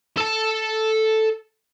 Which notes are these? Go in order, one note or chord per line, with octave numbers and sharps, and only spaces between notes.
A4 A5